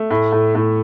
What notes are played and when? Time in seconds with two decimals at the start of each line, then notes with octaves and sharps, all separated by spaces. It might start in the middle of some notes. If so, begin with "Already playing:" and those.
Already playing: A3
0.11 A2
0.32 A2
0.55 A2